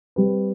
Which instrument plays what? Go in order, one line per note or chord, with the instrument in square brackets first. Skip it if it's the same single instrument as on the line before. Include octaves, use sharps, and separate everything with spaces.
[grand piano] G3 C4 G4 B4